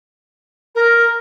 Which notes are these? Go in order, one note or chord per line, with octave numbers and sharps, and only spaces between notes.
A#4